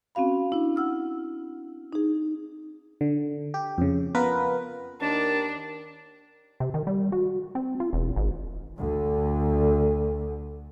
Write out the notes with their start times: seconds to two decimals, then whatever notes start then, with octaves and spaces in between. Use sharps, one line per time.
0.15 C4 C#4 F#4 F5 B5
0.52 D4 E4
0.76 F#5 E6 F6
1.93 D#4 G#4
3.01 D3
3.54 G4
3.78 F2 C#3
4.15 B3 F4 A#4 B4
5.01 D#2 D#3 D4 A5
6.60 C3
6.74 D#3
6.87 G3
7.12 F#4
7.55 C4
7.80 F4
7.93 E1
8.16 G#1
8.78 D2 D3